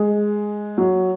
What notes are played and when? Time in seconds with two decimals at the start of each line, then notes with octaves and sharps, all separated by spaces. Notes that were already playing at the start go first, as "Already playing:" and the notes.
Already playing: G#3
0.78 F#3